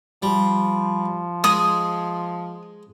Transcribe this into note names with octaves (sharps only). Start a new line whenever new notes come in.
F3 G3
G#3 G#4 D#6